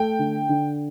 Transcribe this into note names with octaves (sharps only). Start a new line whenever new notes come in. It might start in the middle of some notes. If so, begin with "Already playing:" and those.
Already playing: A3 G5
D3
D3